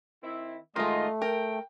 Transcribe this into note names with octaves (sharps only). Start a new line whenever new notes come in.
D#3 C4 E4
D#3 G#3 A3 F4 D#5
A#4 G5